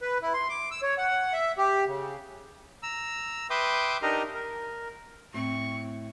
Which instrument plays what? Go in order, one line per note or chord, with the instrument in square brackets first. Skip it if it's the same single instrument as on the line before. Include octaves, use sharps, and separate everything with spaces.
[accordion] B4
E4
C6
D6
E6
C#5
F#5
E5
G4
C#3
[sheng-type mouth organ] A#5 E6
B4 E5 G5 C6 D6 D#6
D4 D#4 G4 A#4 D#5 A#5
A#4
[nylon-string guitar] A2 [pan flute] C4 [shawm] C#6